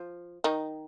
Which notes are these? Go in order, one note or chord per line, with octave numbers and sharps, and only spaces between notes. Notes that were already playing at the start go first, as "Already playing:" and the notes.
Already playing: F3
D#3 D#4